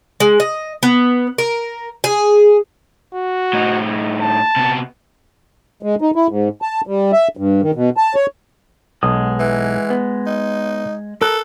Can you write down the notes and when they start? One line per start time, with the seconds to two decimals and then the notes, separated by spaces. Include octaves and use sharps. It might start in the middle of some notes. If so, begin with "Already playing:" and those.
0.20 G#3
0.40 D#5
0.83 B3
1.38 A#4
2.04 G#4
3.14 F#4
3.53 A2 D#4
4.21 A5
4.56 C3 B3
5.83 G#3
6.01 D#4
6.16 E4
6.28 G#2
6.62 A5
6.87 G3
7.13 E5
7.37 G2
7.62 D#3
7.75 B2
7.97 A5
8.15 C#5
9.03 B1 G#3 F#5 D#6
9.40 E3
9.90 B3
10.26 D#4
11.22 A4 A#4 A#5 F#6